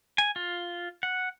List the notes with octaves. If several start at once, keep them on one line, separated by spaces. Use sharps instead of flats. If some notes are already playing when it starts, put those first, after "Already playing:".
G#5
F4
F#5